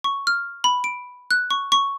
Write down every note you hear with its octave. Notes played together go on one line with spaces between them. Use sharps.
C#6
F6
B5
D7
F#6
C#6
C#6